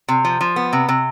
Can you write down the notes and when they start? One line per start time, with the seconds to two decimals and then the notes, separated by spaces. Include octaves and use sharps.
0.08 C3
0.25 F3
0.41 F3
0.56 B3
0.73 C3
0.88 C3